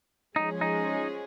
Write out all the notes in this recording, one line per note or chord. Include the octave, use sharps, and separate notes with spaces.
F3 G#3 C#4 D#4 G#4
D#4